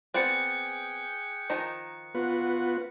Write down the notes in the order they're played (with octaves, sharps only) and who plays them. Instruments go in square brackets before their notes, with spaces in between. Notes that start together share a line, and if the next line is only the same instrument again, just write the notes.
[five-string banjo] B3 C4 D5 [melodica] G#4 G5 [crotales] F#6 C#7
[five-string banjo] D#3 F3 D#4
[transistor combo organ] B3 F4 B4 [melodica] F#4